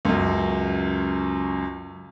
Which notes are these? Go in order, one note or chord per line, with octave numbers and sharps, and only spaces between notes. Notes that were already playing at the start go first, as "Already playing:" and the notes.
C#2 F#2